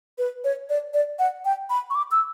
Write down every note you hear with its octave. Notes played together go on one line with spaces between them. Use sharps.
B4
C#5
D5
D5
F#5
G5
B5
C#6
D6
E6